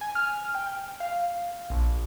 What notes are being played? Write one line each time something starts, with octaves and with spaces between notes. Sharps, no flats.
G#5
F6
G5
F5
A#1